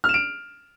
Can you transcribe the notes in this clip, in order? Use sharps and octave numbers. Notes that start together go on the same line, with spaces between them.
F6
E7
D7